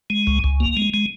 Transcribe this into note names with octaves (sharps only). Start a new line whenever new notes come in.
G#3
C#2
C#2
A#3
G#3
G#3